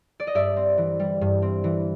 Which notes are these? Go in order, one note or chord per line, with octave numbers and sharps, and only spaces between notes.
D5
D#5
G2 D5 E5
C4
E3
G3
G2
C4
E3